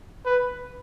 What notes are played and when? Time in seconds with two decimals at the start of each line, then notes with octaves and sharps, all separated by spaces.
0.26 B4